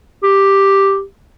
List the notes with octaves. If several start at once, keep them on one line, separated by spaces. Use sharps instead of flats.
G4